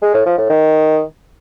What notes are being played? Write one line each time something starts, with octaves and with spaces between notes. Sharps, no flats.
G#3
A2
F3
A2
D#3